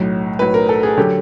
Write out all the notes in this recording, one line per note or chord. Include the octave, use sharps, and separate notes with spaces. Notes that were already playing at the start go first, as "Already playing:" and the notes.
Already playing: B1 A2 F#3
B1 A2 F#3 B4
A#4
A4
G#4
D3 F#3 G4